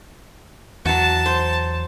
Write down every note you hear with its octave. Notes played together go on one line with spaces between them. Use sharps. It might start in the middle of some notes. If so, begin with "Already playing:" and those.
E2 F#3 F#4 A5
C5